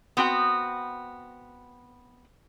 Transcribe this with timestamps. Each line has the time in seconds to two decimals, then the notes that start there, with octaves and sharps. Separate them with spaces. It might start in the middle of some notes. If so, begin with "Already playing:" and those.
0.17 B3 C4 F#4 G5